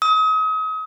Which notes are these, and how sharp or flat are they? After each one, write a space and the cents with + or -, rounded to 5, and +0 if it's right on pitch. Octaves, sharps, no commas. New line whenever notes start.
D#6 +35